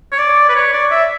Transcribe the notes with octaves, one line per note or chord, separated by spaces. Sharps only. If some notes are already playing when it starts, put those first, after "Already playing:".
C#5
D5
B4
C#5
D5
E5